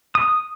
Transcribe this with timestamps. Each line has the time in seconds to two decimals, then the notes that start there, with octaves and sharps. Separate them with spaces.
0.15 D#6